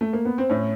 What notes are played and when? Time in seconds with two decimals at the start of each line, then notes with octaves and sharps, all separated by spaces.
0.01 A3
0.13 A#3
0.25 B3
0.38 C4
0.50 A2 C#4